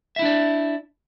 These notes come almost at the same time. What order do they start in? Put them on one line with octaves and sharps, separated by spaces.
E5 E4 D4 D5